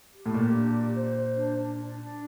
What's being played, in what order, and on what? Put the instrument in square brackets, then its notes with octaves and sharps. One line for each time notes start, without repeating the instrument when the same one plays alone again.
[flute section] G4
[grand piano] A2
[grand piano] A#2 [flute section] G4
[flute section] D4
G4
C5
C5
D4
D4
D4
D4